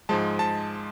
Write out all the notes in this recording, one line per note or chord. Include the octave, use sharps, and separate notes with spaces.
G#2 F3 G#3 A5
A5